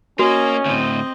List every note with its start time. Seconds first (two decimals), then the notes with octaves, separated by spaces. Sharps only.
0.19 A#3 C#4 F#4 D#5 G#5
0.66 D2 A2 C4 D#5